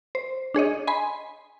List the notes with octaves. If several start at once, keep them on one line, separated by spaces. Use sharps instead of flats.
C5
D4 G#4 C#5 D#5
D#5 G#5 B5 C6